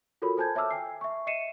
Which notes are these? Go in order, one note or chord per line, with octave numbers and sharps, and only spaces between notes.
F4 F#4 A4 A#4 C#5 B5
A4 C5 G#5 A5 G6 G#6
C#5 E5 A5 D6 E6 F6
G5 G#5 C7
E5 C#6
D#5 E5 C7 C#7 D#7 E7